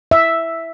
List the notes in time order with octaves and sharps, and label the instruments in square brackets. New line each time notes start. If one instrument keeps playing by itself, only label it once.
[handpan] E5